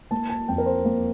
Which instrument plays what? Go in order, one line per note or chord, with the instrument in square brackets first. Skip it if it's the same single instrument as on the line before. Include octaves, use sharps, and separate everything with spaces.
[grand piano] A#3 A5
A5
F2 G5
A#4
C5
A#3